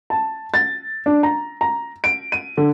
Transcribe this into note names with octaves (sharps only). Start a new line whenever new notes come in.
A5
A6
D4
A#5
A#5
D7
D#7
D3